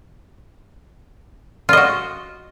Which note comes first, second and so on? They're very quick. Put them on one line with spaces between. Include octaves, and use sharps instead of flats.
F4 D#5 F#4